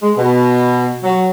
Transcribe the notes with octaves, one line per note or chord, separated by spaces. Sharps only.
G#3
B2
F#3